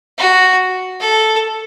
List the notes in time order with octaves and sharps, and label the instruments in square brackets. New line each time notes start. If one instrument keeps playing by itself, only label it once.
[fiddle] F#4
A4